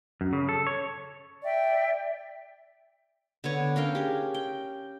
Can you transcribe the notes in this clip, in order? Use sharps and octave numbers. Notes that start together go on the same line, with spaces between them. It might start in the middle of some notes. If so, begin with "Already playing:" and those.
F#2
C#3
A4
C#5
D5 E5 G5
D3 B3 C#5
C#4 A#4 F5 G5
G4 G#4
G5